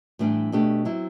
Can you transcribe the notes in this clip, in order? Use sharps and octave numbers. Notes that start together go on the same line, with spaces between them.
A2 E3 G3 D4
B2 A3 D4 G4
F#3 C4 E4